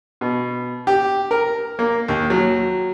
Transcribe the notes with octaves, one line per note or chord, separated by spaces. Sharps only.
B2
G4
A#4
A#3
D#2
F#3